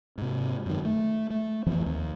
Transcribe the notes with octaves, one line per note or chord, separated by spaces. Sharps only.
G#2 C3
F#2 D#3
A3
A3
F2 E3 F3 C4
D#2